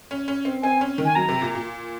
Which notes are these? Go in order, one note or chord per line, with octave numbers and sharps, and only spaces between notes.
C#4
C#4
C4
C4 G#5
C#4
D#3
G#5
F#3 A#5
C3
A#2
A#2